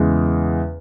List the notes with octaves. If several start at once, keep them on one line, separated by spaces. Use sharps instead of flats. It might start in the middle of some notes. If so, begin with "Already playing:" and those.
Already playing: E2 C#3 G#3